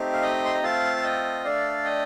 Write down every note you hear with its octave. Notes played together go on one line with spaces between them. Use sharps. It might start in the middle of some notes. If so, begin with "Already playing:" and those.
Already playing: A3 C4 D#4 G4
F5
D#5 G5
C6
A#5
A3 C4 F4 A4 F5 A5
F5
D#5 G5
A3 D4 A4 D5 F5
D#5 G5